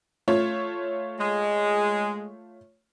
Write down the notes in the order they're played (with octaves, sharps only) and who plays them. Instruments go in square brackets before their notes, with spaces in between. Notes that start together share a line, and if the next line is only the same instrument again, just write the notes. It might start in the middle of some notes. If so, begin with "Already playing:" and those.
[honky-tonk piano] A3 F4 C#5
[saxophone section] G#3